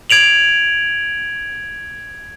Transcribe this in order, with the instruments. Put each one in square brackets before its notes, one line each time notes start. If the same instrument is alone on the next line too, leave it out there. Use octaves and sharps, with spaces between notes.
[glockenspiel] G#6 D7 F7 F#7